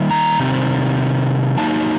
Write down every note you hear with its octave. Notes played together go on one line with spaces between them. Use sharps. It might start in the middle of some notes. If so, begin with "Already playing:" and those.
Already playing: D#3 G3 A#3 D#4
A#5
C3 D#3 G3 C4
F#3 A#3 D#4 A5